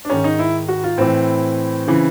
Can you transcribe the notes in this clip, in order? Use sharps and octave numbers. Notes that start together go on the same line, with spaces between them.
D4
G#2 D#3 C#4
D#4
E4
F#4
F4
A2 E3 C4
C#3 E3